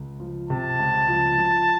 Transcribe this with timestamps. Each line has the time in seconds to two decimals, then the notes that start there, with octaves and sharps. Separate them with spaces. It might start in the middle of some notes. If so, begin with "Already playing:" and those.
Already playing: C#2
0.20 F3
0.50 C3 A5
0.79 C#2
1.09 F3
1.38 F3